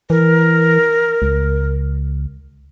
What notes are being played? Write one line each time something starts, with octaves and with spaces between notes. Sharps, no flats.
E3 A#4
C#2